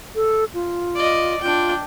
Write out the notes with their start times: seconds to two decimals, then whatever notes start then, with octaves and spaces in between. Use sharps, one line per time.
0.15 A4
0.54 F4
0.95 D5 D#5
1.41 D4 F4 G5